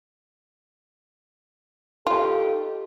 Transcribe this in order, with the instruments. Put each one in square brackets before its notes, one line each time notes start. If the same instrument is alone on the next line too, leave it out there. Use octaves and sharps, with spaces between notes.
[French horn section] D#4 G4 A4 [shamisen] F4